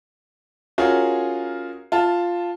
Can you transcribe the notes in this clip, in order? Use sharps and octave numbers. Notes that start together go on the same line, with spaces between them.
C#4 F4 F#4 G#4 A#4
F4 A5